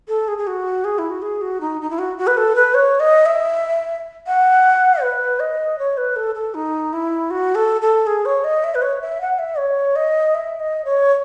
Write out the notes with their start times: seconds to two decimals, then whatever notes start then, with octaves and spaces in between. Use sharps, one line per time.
0.08 A4
0.28 G#4
0.38 G#4
0.47 F#4
0.84 G#4
0.98 E4
1.10 F#4
1.22 G#4
1.41 F#4
1.61 D#4
1.81 D#4
1.90 E4
1.99 F#4
2.18 F#4
2.27 B4
2.37 A4
2.55 B4
2.74 C#5
3.00 D#5
3.26 E5
4.27 F#5
5.02 B4
5.40 D#5
5.79 C#5
5.97 B4
6.16 A4
6.35 A4
6.54 D#4
6.93 E4
7.30 F#4
7.55 A4
7.82 A4
8.07 G#4
8.25 C#5
8.44 D#5
8.64 E5
8.75 B4
8.82 C#5
9.01 E5
9.21 F#5
9.39 E5
9.58 C#5
9.96 D#5
10.35 E5
10.60 D#5
10.85 C#5